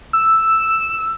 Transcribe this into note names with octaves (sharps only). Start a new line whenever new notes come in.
E6